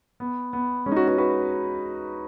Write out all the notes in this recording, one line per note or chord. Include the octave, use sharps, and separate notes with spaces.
B3
B3
G#3 C#4
D#4
C#4 F#4
F#4 B4
F#4 B4